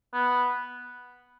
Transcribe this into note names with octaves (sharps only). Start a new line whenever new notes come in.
B3